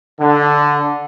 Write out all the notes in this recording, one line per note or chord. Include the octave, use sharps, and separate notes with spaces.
D3